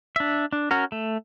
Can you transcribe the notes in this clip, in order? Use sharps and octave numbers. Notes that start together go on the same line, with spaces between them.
D4 E5
D4
C#4 F#4 A#4
A3